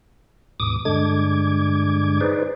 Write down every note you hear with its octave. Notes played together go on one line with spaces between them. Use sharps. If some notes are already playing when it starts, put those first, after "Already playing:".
D#2 G#2 B2 D6 D#6
G2 D3 G#3 D4 D6 G#6
D#4 G#4 B4 C5 D5